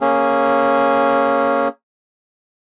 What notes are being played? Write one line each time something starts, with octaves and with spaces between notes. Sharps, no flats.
A#3 C#4 G#4